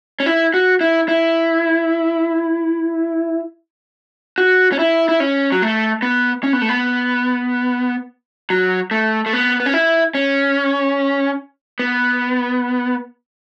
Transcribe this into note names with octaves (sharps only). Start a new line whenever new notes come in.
C#4
E4
F#4
E4
E4
F#4
C#4
E4
E4
C#4
F#3
A3
B3
C#4
B3
A3
B3
F#3
A3
A3
B3
B3
C#4
E4
C#4
B3